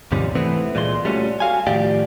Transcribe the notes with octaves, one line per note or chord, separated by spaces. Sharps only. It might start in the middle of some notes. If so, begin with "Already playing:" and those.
D#2 G#2 C3 F3 G3 C#4
E3 A3 B3 C4 E4
C#2 A#2 G#3 D5 C6
G3 A3 C#4 F4 F#4
F#4 F5 G#5
A2 D#3 F3 G4 D5 F5